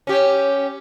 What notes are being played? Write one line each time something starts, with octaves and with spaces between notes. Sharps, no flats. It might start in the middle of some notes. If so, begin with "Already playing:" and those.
C#4 G4